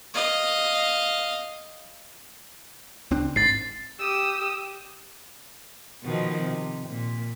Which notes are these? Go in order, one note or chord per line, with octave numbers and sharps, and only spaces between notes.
D#5 F5
C#2 C4 D4
G#1 G#2 A6 C7
G4 D#6 E6
B2 D#3 F3
C3
A#2